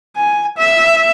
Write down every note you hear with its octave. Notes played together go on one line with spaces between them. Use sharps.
G#5
E5